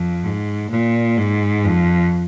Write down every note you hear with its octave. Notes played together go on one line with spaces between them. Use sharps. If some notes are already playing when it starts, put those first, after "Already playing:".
Already playing: F2
G#2
A#2
G#2
F2